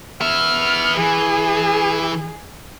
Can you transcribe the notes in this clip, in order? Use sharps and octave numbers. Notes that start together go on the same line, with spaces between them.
B3 E5 F6
E3 G#4